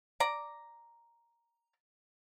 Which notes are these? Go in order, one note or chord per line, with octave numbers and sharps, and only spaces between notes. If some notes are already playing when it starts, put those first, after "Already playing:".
D5 A#5